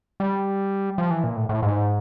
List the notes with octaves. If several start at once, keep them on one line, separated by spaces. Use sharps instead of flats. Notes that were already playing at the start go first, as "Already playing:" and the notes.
G3
F3
E3
A#2
A2
A2
G#2